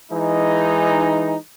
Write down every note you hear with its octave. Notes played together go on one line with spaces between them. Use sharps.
E3 G#3 D#4